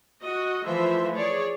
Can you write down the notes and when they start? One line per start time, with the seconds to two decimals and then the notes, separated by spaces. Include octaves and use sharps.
0.23 F#4 D#5
0.66 E3 F3 A3 C5 E5
1.15 G#4 C#5 D5